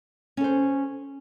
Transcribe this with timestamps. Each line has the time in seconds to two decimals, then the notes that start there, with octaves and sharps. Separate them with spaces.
0.37 C#4
0.41 A4
0.44 C5